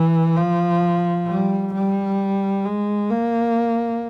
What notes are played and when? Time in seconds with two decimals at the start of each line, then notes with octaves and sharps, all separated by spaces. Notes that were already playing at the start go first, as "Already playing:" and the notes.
Already playing: E3
0.36 F3
1.27 G3
1.73 G3
2.65 G#3
3.10 A#3